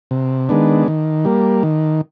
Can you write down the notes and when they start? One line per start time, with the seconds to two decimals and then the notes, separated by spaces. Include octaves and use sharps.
0.11 C3
0.49 D#3 G#3 B3 D4
0.88 D#3
1.25 G3 A#3
1.63 D#3